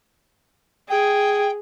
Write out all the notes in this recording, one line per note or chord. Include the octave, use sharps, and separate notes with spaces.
G#4 G5